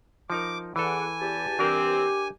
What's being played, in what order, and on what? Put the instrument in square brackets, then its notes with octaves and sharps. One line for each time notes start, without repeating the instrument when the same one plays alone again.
[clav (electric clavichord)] F3 D#4 A#4 [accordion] D6
[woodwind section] E2 F#5 D6 [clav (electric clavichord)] E3 A4 [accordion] G#5
[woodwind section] E2 G4 A5
[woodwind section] C2 E3 C4 [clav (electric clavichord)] D4 A#4 [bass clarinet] G4